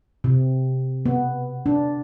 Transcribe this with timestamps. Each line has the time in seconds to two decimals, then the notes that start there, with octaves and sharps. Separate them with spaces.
0.24 C3
1.06 B3
1.66 D4